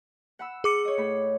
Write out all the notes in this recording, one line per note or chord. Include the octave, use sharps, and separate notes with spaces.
F#5 B5 E6
G#4 D6 C#7
C#5 D#5
A2 B5